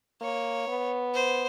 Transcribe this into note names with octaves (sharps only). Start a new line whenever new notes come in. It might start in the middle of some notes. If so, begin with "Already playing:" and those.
A#3 C#5
B3
C5